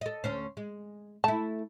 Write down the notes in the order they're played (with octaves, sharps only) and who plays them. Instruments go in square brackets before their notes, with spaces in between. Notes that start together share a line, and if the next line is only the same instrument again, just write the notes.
[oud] A4 D#5
D2 C#4 C5
G#3
[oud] A3 E4 [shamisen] A5